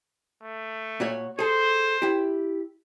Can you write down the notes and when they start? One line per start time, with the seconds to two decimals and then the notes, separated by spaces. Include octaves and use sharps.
0.43 A3
1.00 A#2 F#4 C#5
1.39 G#4 A4 C5
2.02 E4 G4